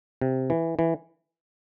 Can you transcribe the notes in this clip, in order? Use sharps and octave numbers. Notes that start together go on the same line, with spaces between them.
C3
E3
E3